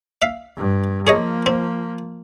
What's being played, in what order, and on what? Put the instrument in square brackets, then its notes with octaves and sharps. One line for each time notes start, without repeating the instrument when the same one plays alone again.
[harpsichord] E5 F5
[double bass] G2
[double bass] F3 A#3 [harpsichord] G#4 C#5 D#5
[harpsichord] C4